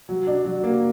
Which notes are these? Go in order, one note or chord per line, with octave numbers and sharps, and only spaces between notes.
F#3
D4
F#3
A#3